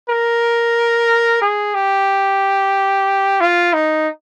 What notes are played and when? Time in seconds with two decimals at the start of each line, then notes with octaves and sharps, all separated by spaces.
0.09 A#4
1.41 G#4
1.74 G4
3.40 F4
3.74 D#4